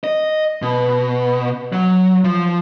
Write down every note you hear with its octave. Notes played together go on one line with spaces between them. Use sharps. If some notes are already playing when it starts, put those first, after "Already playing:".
D#5
B2
F#3
F3